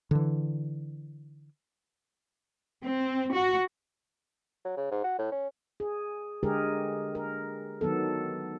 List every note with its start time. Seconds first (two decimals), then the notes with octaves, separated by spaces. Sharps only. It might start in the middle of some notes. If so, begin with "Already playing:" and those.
0.11 D3 E3
2.85 C4
3.33 F#4
4.65 F#3
4.77 C#3
4.91 G#2
5.04 F#4
5.19 A2
5.32 C#4
5.80 G#4
6.43 D3 G#3 G4 G#4 A#4
7.15 A#4
7.81 D#3 F#3 B3 A4